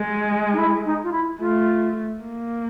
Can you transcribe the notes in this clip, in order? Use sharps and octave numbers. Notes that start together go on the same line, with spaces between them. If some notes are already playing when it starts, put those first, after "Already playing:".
Already playing: G#3
D#4
E4
D#4
F4
E4
A3 F4
A#3